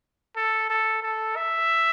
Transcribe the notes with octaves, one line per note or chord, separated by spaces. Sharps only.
A4
A4
A4
E5